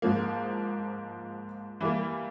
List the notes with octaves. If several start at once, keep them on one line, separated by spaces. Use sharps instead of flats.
G#2 F3 A#3
E3 G3 A#3